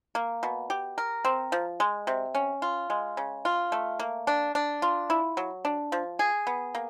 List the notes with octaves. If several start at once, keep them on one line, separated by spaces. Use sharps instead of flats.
A#3
B2
G4
A#4
C4
F3
G#3
C3
C#4
F4
G#3
C#3
F4
A3
A#3
D4
D4
F4
E4
F#3
D4
F3
G#4
B3
A#3